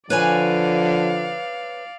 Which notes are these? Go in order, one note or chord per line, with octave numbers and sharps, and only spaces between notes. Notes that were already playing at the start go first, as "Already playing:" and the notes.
D3 F3 B4 C#5 D5 F5 G#5